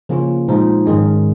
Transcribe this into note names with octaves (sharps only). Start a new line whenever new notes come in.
C#3 F3 A#3 C#4 F4
A#2 F3 G#3 D#4
G#2 D#3 G#3 C#4